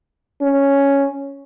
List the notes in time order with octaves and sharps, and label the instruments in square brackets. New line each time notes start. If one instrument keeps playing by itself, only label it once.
[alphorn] C#4